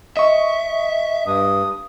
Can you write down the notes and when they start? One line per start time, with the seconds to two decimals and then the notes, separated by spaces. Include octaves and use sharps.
0.17 D#5 E5 C#6
1.26 G2 D#6